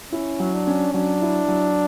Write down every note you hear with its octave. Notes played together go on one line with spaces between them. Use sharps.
C#4 E4
F#3
D4
C#4
F#3 D4
E4
F#3